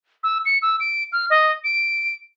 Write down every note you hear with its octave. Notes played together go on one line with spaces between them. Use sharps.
E6
C#7
E6
D7
F6
D#5
D7